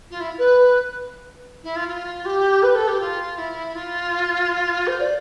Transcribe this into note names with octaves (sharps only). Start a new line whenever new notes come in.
F4
E4
B4
E4
F4
F4
G4
B4
A4
G4
F4
E4
F4
C5
D5